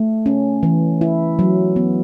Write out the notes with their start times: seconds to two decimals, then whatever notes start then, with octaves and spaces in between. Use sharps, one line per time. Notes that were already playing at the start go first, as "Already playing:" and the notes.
Already playing: A3
0.26 C#4
0.63 E3
1.01 E4
1.39 F#3
1.76 B3